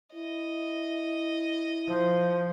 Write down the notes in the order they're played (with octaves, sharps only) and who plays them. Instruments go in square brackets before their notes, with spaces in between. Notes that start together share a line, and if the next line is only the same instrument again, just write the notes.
[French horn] E4 [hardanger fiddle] D#5
[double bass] F3 [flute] C5